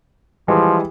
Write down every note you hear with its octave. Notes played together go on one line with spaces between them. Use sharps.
E3 F3 G3 G#3